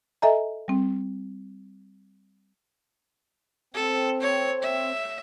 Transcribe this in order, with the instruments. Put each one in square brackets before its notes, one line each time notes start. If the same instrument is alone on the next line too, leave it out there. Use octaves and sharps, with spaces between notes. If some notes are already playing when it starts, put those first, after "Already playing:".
[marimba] A4 D#5 E5 G#5 A#5
G3 C4
[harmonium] C4 [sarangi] A4
[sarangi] C#5
E5